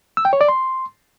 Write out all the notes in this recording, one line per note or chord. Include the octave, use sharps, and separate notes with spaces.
E6
G5
C#5
D5
C6